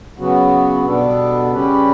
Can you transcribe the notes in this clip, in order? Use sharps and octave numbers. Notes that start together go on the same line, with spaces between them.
C#3 F#3 B3 F#4
B2 G3 B3 D4 A4
C#3 G3 C#4 G4 B4